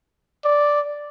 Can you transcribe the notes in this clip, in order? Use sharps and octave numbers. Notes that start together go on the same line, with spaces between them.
D5